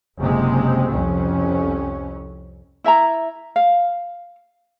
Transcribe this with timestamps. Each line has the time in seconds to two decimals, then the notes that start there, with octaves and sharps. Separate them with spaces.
0.18 F#1 C3 G#3
0.91 C2 F2 C#4
2.84 E4 E5 A5 A#5
3.56 F5